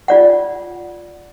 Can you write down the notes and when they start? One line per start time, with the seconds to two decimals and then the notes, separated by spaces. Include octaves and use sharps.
0.08 F4 D5 F#5